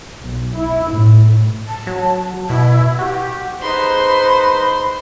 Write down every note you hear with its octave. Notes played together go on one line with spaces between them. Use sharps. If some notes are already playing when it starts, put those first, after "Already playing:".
B1
E4
A2
A5
F#3
B2 E4
F#4 G4
D#4 G#4 B4 C5 B5 C6